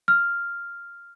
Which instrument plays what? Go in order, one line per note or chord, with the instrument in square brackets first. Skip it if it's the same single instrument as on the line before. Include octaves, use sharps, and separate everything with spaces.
[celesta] F6